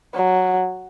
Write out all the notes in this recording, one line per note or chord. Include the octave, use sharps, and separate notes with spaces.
F#3